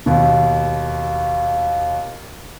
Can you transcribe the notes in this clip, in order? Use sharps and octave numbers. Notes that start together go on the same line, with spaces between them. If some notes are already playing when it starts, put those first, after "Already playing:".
D#2 B2